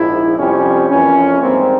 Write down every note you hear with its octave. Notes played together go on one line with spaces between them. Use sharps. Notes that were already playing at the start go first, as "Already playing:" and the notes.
Already playing: A#1 G#2 F3 E4
F2 C3 G3 C4 C#4
F2 E3 A#3 C#4
G#2 G3 A#3 C4